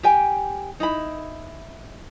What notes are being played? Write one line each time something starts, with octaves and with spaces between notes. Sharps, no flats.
G4 G5 G#5
D#4 E4 B5